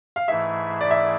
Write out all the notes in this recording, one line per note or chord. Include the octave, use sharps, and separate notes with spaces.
F5
G#2 E3 A3 E4 G#4 E5
D5
E5